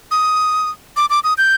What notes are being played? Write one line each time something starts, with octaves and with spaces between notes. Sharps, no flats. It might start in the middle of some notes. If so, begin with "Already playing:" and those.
D#6
D6
D6
D#6
G6